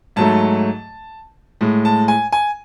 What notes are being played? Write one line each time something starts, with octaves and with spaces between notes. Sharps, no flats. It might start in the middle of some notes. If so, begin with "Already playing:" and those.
G#2 F#3 A3 A5
A2 G#3
A5
G#5
G#5